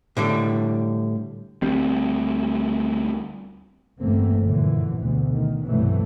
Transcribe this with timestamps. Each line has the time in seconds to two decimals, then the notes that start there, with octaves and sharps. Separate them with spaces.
0.17 A2 D3 G3
1.62 D2 G3 C4
4.00 G1 E2 A3 A#3 C4
4.40 A#1 F#2 D3 E3
4.99 D2 B2
5.31 D#3
5.64 C2 G2 B2 E3 F#3 A3